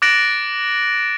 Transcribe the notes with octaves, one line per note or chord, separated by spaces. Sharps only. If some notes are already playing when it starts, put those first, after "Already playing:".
D6 F#6 A6 A#6 D7 F#7